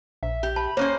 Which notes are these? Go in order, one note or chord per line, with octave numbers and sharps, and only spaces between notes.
A#1 E5
G4
A5 B5
A#3 C#4 C5 C#5